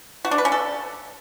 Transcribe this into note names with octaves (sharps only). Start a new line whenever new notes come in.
F#4
D4
B4
C#4
A4